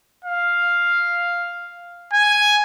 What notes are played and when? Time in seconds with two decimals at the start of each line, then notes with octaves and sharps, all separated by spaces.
0.24 F5
2.13 G#5